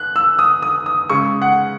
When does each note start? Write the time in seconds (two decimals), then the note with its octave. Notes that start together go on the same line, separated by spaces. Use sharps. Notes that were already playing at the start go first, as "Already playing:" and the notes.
Already playing: F#6
0.16 E6
0.39 D#6
0.62 D#6
0.86 D#6
1.10 C#3 G#3 C#6
1.42 F#5